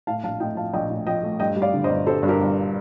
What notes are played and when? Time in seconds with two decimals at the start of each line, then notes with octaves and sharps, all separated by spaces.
0.07 A2 F5 A5
0.24 A#1 F5 A5
0.40 A2 D#5 G5
0.57 F3 F5 A5
0.73 A#1 D#5 G5
0.90 A2
1.07 F3 D#5 G5
1.23 A3
1.39 G2 D#5 G5
1.56 G3
1.62 D5 F5
1.74 D3
1.84 C5 D#5
1.89 G1
2.06 G3 A4 C5
2.23 G2
2.28 G4 A#4
2.40 G1